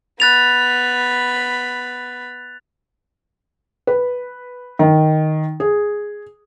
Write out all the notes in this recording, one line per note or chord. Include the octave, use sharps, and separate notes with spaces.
B3 B5 F#6 A6 F7
B4
D#3
G#4